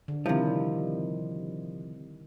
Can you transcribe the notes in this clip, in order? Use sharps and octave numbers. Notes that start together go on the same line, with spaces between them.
D3
C3 D#3 F3 G3 E4